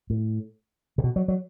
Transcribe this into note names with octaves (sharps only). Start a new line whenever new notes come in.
A2
C3
B2
F#3
F#3